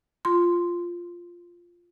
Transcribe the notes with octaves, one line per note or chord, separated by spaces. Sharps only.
F4 C6